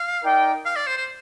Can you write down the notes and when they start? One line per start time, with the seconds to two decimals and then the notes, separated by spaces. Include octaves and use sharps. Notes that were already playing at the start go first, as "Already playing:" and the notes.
Already playing: F5
0.22 D#4 A#4 D5 G5
0.65 F5
0.76 D5
0.87 C5
0.97 C5